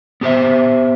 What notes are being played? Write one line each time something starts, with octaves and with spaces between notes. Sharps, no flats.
B3 G4 C5 E5